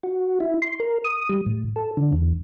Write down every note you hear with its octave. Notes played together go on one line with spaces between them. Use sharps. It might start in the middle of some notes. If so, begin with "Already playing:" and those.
F#4
E4
C6
A#4
D#6
G3
A2
A4
D3
E2